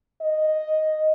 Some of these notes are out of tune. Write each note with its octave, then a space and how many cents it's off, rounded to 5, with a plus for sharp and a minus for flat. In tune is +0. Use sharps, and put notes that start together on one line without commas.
D#5 +0